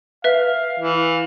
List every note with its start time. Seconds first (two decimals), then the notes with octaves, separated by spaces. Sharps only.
0.24 B4 E5 F5
0.80 E3